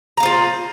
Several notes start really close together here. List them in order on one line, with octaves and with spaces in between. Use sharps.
A#5 F5 C5 F4